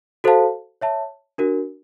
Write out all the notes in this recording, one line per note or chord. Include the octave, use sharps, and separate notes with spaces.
F#4 A4 C5 F5 A5
C#5 E5 A5
D4 F#4 A#4